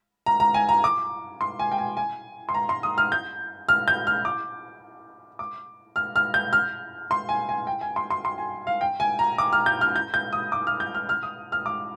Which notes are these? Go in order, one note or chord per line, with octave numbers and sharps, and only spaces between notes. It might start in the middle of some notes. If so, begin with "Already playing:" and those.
A#5
A#5
G#5
A#5
D6
C6
G#5
G5
G#5
G#5
C6
A#5
C6
D#6
F6
G6
F6
G6
F6
D6
D6
F6
F6
G6
F6
C6
G#5
G#5
G5
G#5
C6
C6
C6
G#5
F5
G5
G#5
A#5
D6
F6
G6
F6
G6
G6
D#6
D6
F6
G6
F6
F6
D#6
F6
D6